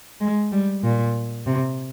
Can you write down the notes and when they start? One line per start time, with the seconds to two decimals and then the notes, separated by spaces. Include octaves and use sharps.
0.20 G#3
0.52 G3
0.83 A#2
1.46 C3